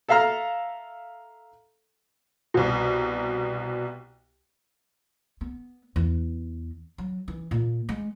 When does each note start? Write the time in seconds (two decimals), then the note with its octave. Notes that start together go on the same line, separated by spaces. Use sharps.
0.08 A4 E5 F5 A#5 F6
2.54 C2 B2
5.41 B3
5.96 E2
6.98 F#3
7.28 E3
7.51 A#2
7.89 G#3